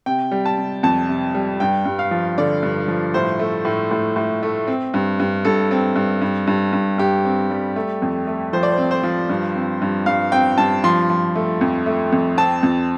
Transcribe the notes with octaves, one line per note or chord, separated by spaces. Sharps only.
C3 G5
G3
A5
C3
F2 A5
C3
G3
G2 G5
G2
F5
F3
D3 D5
G2
F3
A2 C5
A3
A2
A2
A2
A3
C4
G2
G2
G2 A4
C4
G2
G2
G2
G2
G2 G4
C4
G3
A3
F2
A3
F3 C5
D5
C5
C4
C5
F3
G2
C4
G2
G2 F5
C4 G5
G2 A5
F3 C6
F3
A3
F2
A3
F2
C4 A5
F2